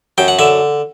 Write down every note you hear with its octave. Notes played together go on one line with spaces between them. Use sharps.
F#2 G5
F#5
D3 E5